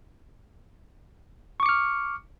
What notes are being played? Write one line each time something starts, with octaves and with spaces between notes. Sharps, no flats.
C#6 D6 F6 C#7